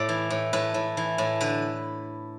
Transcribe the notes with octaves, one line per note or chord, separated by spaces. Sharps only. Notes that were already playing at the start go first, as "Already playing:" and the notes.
Already playing: A2 D5
E3
A2
A2 B4
A2
E3
A2
D3 B4